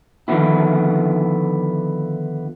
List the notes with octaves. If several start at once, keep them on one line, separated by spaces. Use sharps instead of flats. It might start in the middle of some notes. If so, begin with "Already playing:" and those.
D3 D#3 F3 B3 E4